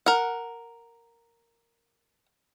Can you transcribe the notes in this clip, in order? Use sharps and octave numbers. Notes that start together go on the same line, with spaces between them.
A#4 F#5